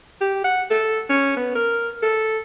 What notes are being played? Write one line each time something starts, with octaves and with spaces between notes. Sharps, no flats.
G4
F#5
A4
C#4
B3
A#4
A4